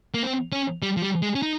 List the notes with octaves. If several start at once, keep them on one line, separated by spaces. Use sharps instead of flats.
A#3
C4
C#4
G3
F3
G3
G#3
C#4
D#4